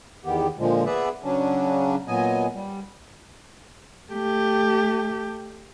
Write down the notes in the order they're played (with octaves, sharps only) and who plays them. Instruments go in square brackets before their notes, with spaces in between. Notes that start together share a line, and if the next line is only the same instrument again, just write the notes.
[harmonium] E2 D#3 B3 G4
A#2 D3 F3 G#3
B3 G#4 B4 D5 E5
C#3 F#3 C#4 D4
A#2 F#3 B3 D#5 G#5
G3
[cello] A3 G4